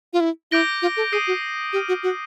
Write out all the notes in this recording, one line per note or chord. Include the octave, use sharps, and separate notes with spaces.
F4
E4
E4 D6 G6 A#6 D7 G7
F4
A4
G#4 D#6 G6 C7 D#7
F#4
G4 D6 F6 A#6 D#7
F#4
F#4